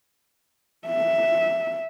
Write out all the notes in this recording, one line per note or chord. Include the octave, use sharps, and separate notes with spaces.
E5